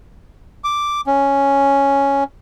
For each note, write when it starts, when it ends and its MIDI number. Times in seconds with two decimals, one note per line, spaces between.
0.64 1.01 86
1.07 2.24 61